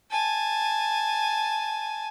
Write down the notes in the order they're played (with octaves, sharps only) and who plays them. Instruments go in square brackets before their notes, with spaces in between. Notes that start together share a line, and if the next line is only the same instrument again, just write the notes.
[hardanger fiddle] G#5 A5